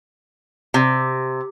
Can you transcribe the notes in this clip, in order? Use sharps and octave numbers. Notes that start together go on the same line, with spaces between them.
C3